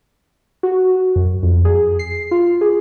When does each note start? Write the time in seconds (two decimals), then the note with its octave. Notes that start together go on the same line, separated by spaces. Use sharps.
0.63 F#4
1.16 F#2
1.43 F2
1.65 G#4
1.99 C7
2.31 F4
2.61 G#4